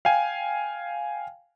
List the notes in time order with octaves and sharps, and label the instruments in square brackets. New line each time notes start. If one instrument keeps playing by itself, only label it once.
[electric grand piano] F5 G5 G#5